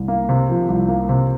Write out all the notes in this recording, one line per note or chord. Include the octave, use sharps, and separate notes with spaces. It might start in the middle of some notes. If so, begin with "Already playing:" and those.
Already playing: C2
A#3
C3
F3
C2
A#3
C3